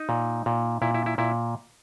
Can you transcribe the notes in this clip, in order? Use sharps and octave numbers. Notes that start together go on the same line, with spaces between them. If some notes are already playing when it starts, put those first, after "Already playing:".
Already playing: D#4
A#2
A#2
A#2 E4
E4
E4
A#2 E4